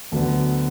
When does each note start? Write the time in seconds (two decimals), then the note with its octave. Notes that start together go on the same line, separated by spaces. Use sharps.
0.11 D2 D3 F#3 B3